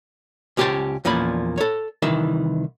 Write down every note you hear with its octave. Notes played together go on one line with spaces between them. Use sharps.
C#2 C#4 G4 G#4 C5 A5
E2 A#2 F3 C#4 B5
A4 C#5
C2 D#3 E3 E5